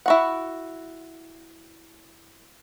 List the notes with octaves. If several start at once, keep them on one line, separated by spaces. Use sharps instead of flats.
E4 F#4 F#5